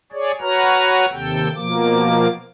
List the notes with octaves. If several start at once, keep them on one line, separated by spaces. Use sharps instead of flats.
G#4 C#5 D5
F#4 B4 C#5 A#5 F6
D#2 C3 A4 G5
B2 F3 A#3 D6